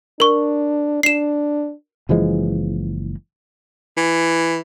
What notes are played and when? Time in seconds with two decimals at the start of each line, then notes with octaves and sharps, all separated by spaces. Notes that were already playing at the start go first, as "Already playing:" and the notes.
0.20 D4 A#4 C#6
1.03 D4 C7 E7
2.09 F#1 E3 F3 G#3
3.97 E3